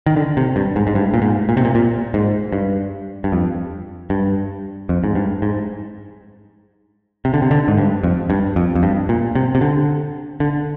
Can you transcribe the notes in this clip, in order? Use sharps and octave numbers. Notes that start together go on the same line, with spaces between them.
D#3
D3
C3
G2
G#2
G#2
G2
A#2
G#2
A#2
C3
A#2
A#2
G#2
G2
G2
F2
G2
F2
G#2
G2
G#2
C3
D3
C3
D3
G#2
G2
F2
G2
F2
F2
G2
A#2
C3
C3
D3
D3